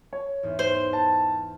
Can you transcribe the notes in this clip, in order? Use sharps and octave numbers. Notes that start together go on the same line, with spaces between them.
C#5
E2 G#2
C5
A5